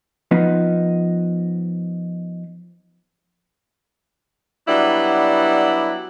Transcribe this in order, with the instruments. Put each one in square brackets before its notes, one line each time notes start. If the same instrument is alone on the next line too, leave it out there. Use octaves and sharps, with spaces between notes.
[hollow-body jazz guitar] F3 B3 D#4
[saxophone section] F#3 G3 B3 D4 E4